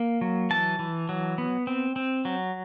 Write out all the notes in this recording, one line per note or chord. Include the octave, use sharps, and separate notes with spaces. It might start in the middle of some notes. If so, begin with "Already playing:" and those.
Already playing: A#3
F#3
E3 A5
E3
F#3
B3
C4
C4
F#3